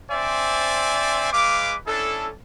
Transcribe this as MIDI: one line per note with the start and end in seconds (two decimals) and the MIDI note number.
0.11 1.30 60
0.11 1.30 62
0.11 1.30 72
0.11 1.30 74
0.11 1.30 76
0.11 1.30 80
1.33 1.76 56
1.33 1.76 71
1.33 1.76 77
1.33 1.76 86
1.87 2.30 61
1.87 2.30 62
1.87 2.30 64
1.87 2.30 69